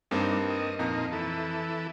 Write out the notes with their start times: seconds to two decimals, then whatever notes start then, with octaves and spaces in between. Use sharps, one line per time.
0.11 G2 G3 A#3 C4 D#4
0.50 D#5
0.79 F2 A#2 D#4 A#5
1.12 E3 A4